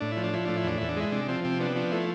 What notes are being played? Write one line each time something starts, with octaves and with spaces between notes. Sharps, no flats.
A2 D4
E4
F3
D4
F3 E4
A2 D4
E4
E2 D4
E2 E4
D4
G#3 E4
C3 D4
F3 C4
C3 C4
B3 D4
F3 D4
A3 E4